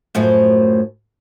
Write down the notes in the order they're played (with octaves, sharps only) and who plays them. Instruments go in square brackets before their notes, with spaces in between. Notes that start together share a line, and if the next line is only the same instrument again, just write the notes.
[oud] F#2 A2 F3